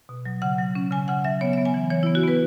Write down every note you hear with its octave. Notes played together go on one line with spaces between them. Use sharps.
B2
F#3
C#3 F#5
F#3
C#4
C#3 G#5
C#3 F#5
F#3 E5
B3 C#5
B3 E5
G#5
E3
E3 C#5
B3 E4
F#4
B3 B4